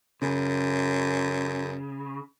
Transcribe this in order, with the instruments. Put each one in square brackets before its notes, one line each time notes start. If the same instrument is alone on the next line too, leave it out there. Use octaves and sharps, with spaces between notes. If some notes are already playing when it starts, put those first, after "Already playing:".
[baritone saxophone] F#2 [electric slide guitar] C#3